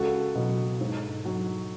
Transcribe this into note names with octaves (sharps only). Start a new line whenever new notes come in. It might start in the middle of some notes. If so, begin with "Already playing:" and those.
Already playing: C#2 F#4 A4
B2 F#3
G#2
F#3